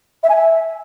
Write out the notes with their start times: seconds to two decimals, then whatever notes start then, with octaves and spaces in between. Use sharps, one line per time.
0.23 E5
0.29 G#5
0.35 E5